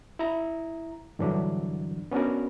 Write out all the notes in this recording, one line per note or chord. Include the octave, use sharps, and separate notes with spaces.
E4 A#5
G2 D3 E3 F#3 D4
B3 C#4 D4 F#4 A#4